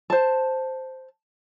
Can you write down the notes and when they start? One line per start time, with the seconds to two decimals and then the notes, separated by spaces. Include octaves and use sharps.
0.10 C5 A5